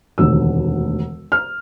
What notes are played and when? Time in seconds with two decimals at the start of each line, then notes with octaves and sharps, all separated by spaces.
0.18 E1 D2 C3 D#3 E6
1.32 F6